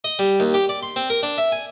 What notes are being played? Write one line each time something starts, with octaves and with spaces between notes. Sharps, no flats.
D#5
G3
D#2
G4
D5
C6
C4
A#4
D4
E5
G#5